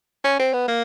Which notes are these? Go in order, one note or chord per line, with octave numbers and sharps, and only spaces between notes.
C#4
C4
B3
A#3